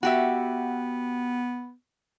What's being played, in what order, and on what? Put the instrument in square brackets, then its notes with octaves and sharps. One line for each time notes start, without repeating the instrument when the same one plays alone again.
[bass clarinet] B3 [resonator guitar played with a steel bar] F#4 G4 E5